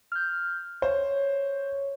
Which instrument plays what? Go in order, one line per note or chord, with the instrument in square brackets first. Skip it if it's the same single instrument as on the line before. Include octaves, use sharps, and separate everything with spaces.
[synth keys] F6 G6
[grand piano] C5 [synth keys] C#5